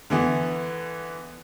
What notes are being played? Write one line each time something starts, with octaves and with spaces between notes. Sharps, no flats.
D3 E3 B3